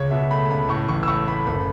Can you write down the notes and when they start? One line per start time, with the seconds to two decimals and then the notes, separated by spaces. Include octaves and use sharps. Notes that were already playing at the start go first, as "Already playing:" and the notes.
Already playing: C#2 C#3 C#5
0.11 B2 E5
0.31 A3 B5
0.50 C#2 B5
0.69 A2 C#6
0.88 A1 C#6
1.03 E6
1.08 A2 C#6
1.27 A3 B5
1.47 F#1 B5